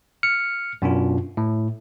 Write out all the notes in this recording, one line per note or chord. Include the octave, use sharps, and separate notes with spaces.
F6 C#7
F#2 B2 D4 F4
A2